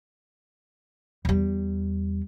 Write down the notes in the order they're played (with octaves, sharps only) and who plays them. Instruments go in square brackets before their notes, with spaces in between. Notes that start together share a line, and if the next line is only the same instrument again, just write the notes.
[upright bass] E2 G3